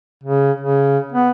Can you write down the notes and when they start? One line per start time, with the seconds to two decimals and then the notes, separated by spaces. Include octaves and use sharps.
0.24 C#3
0.60 C#3
1.12 B3